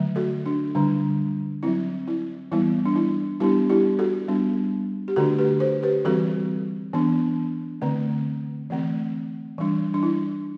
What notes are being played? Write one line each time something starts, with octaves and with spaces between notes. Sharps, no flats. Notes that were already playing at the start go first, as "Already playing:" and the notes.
Already playing: D3 F#3 A3
F#4 A4
D4
D3 G3 D4
F#3 C4 E4
E4
E3 G3 B3 E4
D4
E4
G3 B3 D4 E4 G4
E4 G4
F#4 A4
G3 B3 D4
G4
D3 A3 D4 F#4 A4
G4 B4
A4 C5
G4 B4
E3 G3 C4 F#4 A4
E3 B3 D4
D3 A3 C4
E3 A3 C4
E3 G3 D4
D4
E4